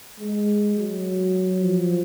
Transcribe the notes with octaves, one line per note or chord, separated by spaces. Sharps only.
G#3
F#3
F3